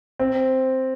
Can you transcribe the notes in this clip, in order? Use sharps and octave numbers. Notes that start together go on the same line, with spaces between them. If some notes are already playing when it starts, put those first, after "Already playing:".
C4